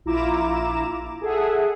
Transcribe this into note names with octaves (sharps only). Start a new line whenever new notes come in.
A#1 E4 F4 A#5 D6 E7
G#4 A4 E5 F#5